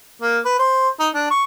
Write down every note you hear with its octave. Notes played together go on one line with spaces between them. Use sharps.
A#3
B4
C5
D#4
D4
C#6